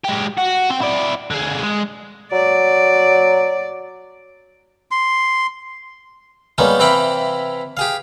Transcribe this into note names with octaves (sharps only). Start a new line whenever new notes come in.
G#3 G4
F#4
C4 G5
E4 D5
D3 G#4
G#3
F#3 D5
C6
G3 G#3 A#3 B3 C#4 D#4
C3 E3 E4 F5 G5 B5
G4 G#4 F5